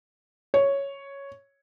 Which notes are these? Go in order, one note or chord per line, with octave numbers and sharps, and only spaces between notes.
C#5